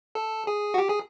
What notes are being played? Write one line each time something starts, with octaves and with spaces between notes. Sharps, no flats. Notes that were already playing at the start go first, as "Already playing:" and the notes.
A4
G#4
F#4
G4
G#4